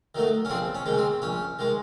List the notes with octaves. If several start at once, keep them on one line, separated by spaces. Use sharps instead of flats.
D#3 F#3 A3
C#4
A#1 C4 D4
C#4
G#2 D#3 G#3
C4
A#1 C#4
D#3 G#3